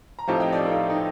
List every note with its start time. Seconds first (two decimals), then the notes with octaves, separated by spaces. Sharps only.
0.19 A#5
0.28 A2 F3 C4 D#4 G4 F5 A5
0.40 D#5 G5
0.52 D5 F5
0.65 F4 A4
0.90 D#4